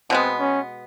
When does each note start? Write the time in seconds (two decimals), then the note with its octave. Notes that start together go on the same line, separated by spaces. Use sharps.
0.10 B2 G#3 B3 C4
0.40 C#4